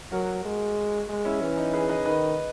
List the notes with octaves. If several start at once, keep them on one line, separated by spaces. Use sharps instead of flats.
F#3 F#4 A#4
G#3
G#3
C#4 E4
E3 C#4
D#4
G#4 B4
B4 D#5
D#3 B4 D#5